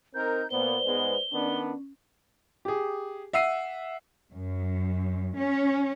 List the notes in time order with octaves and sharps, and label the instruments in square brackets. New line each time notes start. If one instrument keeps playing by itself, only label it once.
[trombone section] C4 D#4 A#4 [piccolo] G6
[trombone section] A#2 B3 [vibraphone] B4 C5 D5 [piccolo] G7
[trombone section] G#2 G#3 B3
[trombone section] D#3 B3 D4 [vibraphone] C#4
[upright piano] G4 G#4
E5 F#5 E6 C7 D#7
[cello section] F#2
C#4